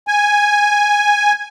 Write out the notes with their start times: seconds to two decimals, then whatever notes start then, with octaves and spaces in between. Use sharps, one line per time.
0.08 G#5